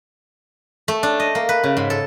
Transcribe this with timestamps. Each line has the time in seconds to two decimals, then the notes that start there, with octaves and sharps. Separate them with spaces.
0.88 A3
1.03 D4
1.20 D#5
1.35 A#3
1.49 B4
1.64 C#3
1.77 G#2
1.90 A4